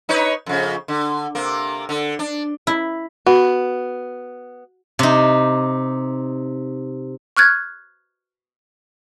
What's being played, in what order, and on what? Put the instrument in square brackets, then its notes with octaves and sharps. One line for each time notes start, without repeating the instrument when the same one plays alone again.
[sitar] D#4 B4 C#5
F2 C#3
D3
C3 A#3
D3
D4
[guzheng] E4
[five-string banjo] B3 [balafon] F#4
[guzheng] C3 D#4
[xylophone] C#6 F6 F#6 G#6 A6